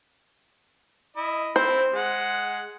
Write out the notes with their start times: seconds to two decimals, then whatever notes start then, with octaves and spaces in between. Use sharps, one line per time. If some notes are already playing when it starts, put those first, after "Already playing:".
1.17 E4 D#5
1.56 C4 E4 C5
1.93 G#3 F#5